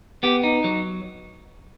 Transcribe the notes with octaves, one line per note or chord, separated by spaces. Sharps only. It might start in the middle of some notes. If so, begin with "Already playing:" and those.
B3 G4
D#4
F#3